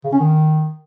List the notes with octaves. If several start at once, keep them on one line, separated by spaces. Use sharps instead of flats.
C#3
C#4
D#3